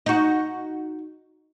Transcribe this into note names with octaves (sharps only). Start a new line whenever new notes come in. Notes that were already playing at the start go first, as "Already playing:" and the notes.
D#4 F#4